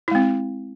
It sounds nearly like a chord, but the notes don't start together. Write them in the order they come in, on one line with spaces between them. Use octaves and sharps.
E4 G#3 C4